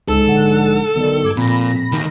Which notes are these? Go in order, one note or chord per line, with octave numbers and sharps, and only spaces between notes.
C#2 G#2 A4 E6
A#1 D3 F#5
B1 D3 D#3
G2 D6 G#6
F2 A#2 B5 A#6
D2 D#3